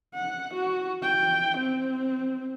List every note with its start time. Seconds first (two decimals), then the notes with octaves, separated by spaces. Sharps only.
0.15 F#5
0.54 F#4
1.03 G5
1.57 C4